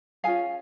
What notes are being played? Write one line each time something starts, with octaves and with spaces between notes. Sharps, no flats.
C#4 F4 G#4 F5 G#5